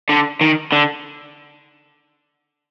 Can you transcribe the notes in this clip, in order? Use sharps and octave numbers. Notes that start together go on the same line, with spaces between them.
D3
D#3
D3